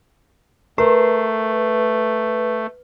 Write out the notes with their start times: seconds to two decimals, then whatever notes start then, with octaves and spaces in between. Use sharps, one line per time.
0.78 A3 A#4 B4